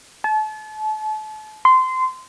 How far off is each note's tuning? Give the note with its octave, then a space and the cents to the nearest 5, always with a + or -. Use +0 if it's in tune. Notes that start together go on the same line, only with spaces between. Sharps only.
A5 -35
C6 -20